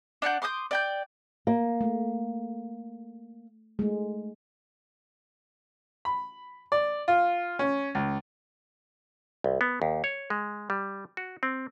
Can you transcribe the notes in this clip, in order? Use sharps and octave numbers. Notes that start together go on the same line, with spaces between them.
D4 D5 F#5 G6
C6 D6 D#6 G6
D5 G5 G6
A#3
A3
G#3 A3
B5
D5
F4
C#4
C#2
C2
B3
D#2
C#5
G#3
G3
F#4
C4